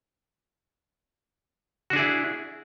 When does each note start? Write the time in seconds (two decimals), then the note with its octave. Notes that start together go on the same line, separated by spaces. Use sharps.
1.90 F#4
1.93 D4
1.96 G#4
1.99 E4